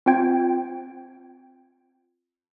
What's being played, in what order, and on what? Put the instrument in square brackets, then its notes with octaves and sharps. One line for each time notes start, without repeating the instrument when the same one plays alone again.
[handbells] C4 F4 G5 G#6